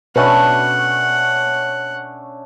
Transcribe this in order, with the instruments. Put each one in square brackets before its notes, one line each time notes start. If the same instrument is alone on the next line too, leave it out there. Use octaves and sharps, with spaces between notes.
[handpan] B2 B4 [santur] A3 C#4 D4 [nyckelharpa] F#5